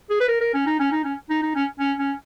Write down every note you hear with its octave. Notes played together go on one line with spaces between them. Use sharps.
G#4
B4
A#4
A#4
C#4
D#4
C#4
D#4
C#4
D#4
D#4
C#4
C#4
C#4